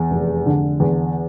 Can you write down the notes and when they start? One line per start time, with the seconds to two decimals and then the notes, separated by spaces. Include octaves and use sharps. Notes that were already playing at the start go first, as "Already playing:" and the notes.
Already playing: E2
0.11 F1
0.46 D3
0.80 E2